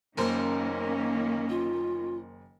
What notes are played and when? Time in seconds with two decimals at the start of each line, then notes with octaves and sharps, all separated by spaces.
0.17 F#1 D#3 A#3 C#4 A#4 C5
1.50 F4